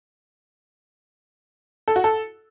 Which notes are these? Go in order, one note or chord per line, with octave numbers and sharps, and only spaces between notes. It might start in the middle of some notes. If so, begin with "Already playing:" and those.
A4
F#4
A4